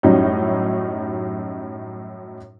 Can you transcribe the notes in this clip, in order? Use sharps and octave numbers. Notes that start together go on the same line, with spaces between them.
F#2 A2 F#3 G3 C#4 D#4